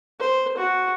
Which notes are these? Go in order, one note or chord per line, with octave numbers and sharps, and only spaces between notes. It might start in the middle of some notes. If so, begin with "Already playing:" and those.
C5
F#4